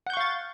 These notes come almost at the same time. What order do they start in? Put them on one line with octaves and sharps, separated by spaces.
F#5 G6 C#6 F5 A6